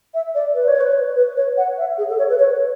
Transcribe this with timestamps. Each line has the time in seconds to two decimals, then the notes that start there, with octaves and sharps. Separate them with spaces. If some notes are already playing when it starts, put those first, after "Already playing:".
0.14 E5
0.35 D5
0.55 B4
0.68 C#5
0.81 B4
1.16 B4
1.36 C#5
1.57 F#5
1.78 E5
1.98 G#4
2.09 A4
2.19 C#5
2.30 B4
2.40 C#5